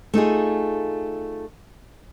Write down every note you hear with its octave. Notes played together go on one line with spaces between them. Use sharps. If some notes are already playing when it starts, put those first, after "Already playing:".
A3 D#4 F4 G#4